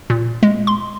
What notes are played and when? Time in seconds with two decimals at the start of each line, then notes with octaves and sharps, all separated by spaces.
0.10 A#2
0.43 G#3
0.67 C6